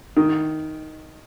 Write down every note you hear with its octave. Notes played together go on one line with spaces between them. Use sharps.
D#3